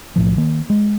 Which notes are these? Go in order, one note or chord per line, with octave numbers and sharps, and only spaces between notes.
B1 A2 F3
D#3 A#3
G#3